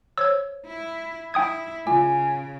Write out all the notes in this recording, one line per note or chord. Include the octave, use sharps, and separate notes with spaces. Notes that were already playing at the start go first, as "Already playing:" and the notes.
C5 C#5 E6 G#6
E4
E4 G5 D#6 G#6
C#3 F4 G#5